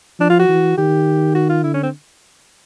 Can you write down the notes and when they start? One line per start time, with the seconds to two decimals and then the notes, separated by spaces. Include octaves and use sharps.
0.19 F3 D4
0.30 F4
0.39 F#4
0.49 E3
0.78 D#3 G4
1.35 F#4
1.50 F4
1.64 D3 E4
1.74 C#4
1.83 C4